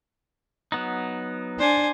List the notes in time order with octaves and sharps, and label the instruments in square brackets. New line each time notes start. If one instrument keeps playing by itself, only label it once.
[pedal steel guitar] F#3 B3 D#4
[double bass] D4 [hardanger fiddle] C5 G#5